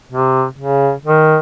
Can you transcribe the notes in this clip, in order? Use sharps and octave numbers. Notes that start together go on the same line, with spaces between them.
C3
C#3
D#3